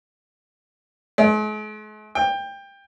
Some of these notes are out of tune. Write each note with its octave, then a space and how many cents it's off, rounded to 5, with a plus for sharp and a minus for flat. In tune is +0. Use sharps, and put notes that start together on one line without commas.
G#3 +45
G5 +20